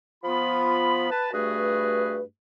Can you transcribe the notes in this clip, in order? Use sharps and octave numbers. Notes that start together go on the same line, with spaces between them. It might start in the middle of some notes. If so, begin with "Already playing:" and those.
F3 B3 F4 B5
B4 A5
G2 A3 F#4 G#4 B4